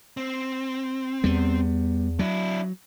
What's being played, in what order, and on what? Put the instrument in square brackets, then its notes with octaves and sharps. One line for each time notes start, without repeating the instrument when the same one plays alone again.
[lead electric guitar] C4
[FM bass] E2 [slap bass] G3 B3
[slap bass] F#3 [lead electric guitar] D4 E4